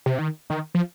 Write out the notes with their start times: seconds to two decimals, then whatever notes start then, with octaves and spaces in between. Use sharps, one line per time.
0.06 C3
0.19 D#3
0.50 D#3
0.74 F3